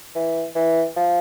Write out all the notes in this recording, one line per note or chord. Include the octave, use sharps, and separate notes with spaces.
E3
E3
F3